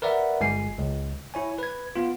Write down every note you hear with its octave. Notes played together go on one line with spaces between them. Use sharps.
A#4 B4 D5 E5 F#5
G1 G#3 G#5 C7
C#2
E4 C#5 G#5
B4 G#6
B3 F4